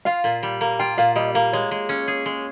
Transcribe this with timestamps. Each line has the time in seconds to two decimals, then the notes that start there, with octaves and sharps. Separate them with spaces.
0.05 F4 F5
0.24 A#2
0.43 G3
0.61 A#3
0.79 F4 G5
0.98 A#2 F5
1.16 G3 D#5
1.34 A#3 F5
1.53 G#3 C#5
1.71 G#3
1.89 C#4
2.08 G#4
2.26 G#3